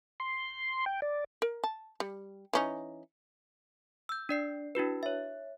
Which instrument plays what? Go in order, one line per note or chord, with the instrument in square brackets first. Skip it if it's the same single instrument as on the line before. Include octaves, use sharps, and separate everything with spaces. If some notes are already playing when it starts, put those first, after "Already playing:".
[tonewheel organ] C6
G5
D5
[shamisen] A#4
A5
G3
E3 C#4 D#4
[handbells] E6 G6
D4 D5 C7
D4 E4 F#4 B4
C#5 E5